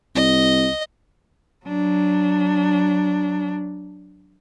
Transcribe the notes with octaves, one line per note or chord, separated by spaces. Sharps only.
C2 D#5
F#3 D4